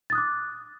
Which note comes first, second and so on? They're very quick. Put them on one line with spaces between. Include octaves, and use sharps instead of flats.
A6 D#6 F#6 D6